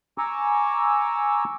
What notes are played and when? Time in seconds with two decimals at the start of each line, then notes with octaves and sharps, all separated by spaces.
0.18 G#5 A#5 C#6 D6 E6